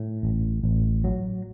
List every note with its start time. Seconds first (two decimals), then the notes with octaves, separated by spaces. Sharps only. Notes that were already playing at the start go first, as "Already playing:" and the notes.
Already playing: A2
0.23 A1
0.64 A1
1.04 F#3